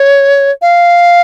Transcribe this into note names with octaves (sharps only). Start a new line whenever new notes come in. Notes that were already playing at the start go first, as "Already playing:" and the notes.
Already playing: C#5
F5